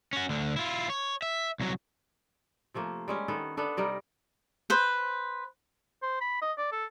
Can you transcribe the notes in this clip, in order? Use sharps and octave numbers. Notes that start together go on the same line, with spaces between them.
C#4 F#4
D2 D3
E4 F4
C#5
E5
C2 F#3
C3 F3 A3 A#3
G3 G#3 C#4
D#3 B3 A4
B3 D4 A4 E5
C3 G3 D#4 A#4
B4 C5
C5
B5
D#5
D5
A4